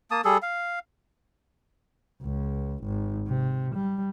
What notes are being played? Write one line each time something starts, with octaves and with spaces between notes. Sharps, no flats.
A#3 A5 D#6
G3 G#4 A4
F5
C#2
G#1
C3
G3